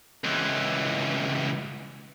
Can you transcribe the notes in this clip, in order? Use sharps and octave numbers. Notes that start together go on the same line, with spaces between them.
C#2 E3